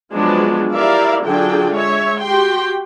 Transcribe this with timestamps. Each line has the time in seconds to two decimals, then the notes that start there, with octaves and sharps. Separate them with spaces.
0.13 F3 F#3 G#3 B3 D4
0.74 E4 G4 A#4 D5 E5 F5
1.23 D3 F#3 D4 F4 G#4 G5
1.74 G#3 C#5 E5
2.22 F#4 G4 G5 C6